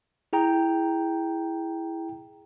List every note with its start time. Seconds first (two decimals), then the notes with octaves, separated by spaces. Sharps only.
0.33 E4 G#4 G5 A#5